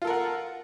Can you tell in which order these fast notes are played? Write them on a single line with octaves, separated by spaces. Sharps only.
F4 A4 A#4 F#5